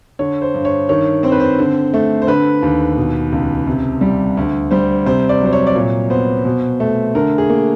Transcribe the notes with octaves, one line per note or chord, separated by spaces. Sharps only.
D3 C#5
C5
G2
C#5
D#3 C#5
C4 C5
B4
C5
D3
A3
C5
D3 B4
D#2
B2
C#2
C3
G3
D2
G3 C5
C3 C5
D5
F#3 C5
C#5
D5
A#2 C#5
B3 C5
B2
A3
D3 A#4
G#4
A#3